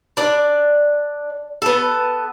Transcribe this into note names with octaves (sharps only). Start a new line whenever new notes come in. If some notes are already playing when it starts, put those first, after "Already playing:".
D4 D5
B3 A4